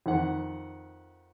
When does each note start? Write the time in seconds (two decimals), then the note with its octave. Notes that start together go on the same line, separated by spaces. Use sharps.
0.06 F2 D#3 F#5